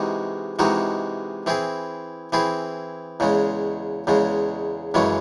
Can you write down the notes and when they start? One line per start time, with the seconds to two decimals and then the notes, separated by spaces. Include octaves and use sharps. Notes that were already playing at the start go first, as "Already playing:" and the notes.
Already playing: C3 E3 G#3 D#4 F#4
0.59 C3 E3 G#3 D#4 F#4
1.46 E3 C4 E4 G#4
2.33 E3 C4 E4 G#4
3.20 E2 C#3 G#3
4.07 E2 C#3 G#3
4.94 F#2 C#3 E3 G#3 C#4